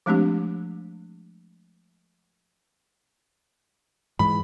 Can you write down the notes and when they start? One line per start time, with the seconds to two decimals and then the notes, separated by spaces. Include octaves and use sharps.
0.06 F3 G#3 A3 C4 D4 G4
4.19 G#2 E3 G#3 B5